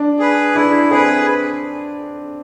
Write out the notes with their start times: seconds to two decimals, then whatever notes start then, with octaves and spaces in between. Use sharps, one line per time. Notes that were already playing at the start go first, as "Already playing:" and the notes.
Already playing: D4
0.19 G#4 B4
0.55 D4 E4
0.90 C4 G#4 B4